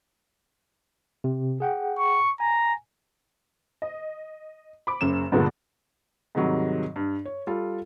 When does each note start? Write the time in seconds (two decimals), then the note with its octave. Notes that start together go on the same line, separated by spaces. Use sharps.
1.24 C3
1.60 G#4 F#5 G5
1.99 C#6
2.40 G#5 A#5
3.82 D#5
4.87 B5 D6
5.01 F#1 F#2 E7
5.32 G2 A#2 D3 G#3 A#3 B3
6.35 G#2 C3 D#3 F#3 G3
6.96 G2
7.25 C#5
7.47 G3 F4 A4